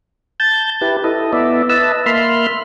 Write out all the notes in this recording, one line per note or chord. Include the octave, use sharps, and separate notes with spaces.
A5 G6 A6
E4 G4 B4
E4 A4 D#5
B3 E4 D5 E5
B4 D#5 E5 A5 E6
A#3 E5 B5 C6 F6